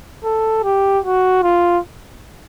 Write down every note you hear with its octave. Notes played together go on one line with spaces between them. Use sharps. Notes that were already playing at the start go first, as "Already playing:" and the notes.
A4
G4
F#4
F4